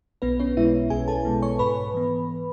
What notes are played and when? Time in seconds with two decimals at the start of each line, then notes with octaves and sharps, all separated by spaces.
0.22 B1 B3 B4
0.40 C#4 C#5
0.57 B2 G#3 B3 E4 E5
0.90 B1 G#4 G#5
1.08 A4 A5
1.25 B2 G#3 B3
1.42 C#5 C#6
1.59 G#2 B4 B5
1.94 E3 B3